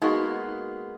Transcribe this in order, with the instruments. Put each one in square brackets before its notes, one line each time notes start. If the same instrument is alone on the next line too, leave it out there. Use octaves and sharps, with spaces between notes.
[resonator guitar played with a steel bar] G#3 A#3 B3 [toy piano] D#4 F#4 C#6